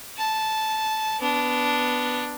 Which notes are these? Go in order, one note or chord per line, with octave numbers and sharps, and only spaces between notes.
A5
B3 D4